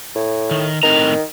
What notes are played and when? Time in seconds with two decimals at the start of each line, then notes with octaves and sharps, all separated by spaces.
0.15 A2
0.51 D#3
0.83 A2 D#3 C4 A#5